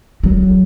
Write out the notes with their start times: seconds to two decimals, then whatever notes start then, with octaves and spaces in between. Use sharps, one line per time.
0.24 F#3